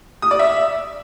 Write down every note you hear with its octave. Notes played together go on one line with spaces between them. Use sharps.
D#6
D5
E5